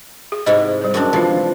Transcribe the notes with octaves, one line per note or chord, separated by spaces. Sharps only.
G#4
G#2 C3 E4 D#5
G3 C5
F#2 C4 D4
C3 E3 F3 G#3 F4